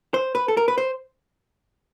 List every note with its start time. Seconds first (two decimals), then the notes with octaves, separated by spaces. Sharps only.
0.14 C5
0.35 B4
0.48 A4
0.57 A#4
0.68 B4
0.78 C5